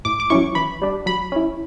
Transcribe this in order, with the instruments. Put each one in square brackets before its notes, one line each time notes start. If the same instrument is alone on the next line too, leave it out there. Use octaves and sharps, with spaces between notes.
[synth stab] A2 D6
D6
F#3 C#4 E4 C#6
E3 B5
G3 D4
F#3 B5
C#4 E4